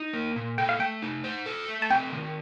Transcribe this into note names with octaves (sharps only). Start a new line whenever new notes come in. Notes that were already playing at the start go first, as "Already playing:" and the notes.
Already playing: D#4
A#3
A#2
A4 G5
F5
A3 G5
D#4
C5
A4
A3
A5
C4 G5
D#3